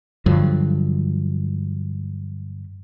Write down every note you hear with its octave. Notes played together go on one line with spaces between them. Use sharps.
G2 D3 F3 F#3